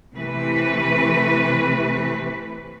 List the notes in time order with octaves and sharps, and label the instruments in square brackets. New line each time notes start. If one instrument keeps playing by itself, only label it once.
[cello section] C3 E3 A3 B4